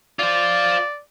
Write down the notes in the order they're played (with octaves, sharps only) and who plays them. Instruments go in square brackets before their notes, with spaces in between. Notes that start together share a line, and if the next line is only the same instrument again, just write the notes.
[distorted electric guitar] F4 C5 [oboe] D5